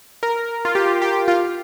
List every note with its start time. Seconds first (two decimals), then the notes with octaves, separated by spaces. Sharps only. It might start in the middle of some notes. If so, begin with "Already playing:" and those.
0.23 A#4
0.65 F4
0.75 G4
1.02 G4
1.28 F4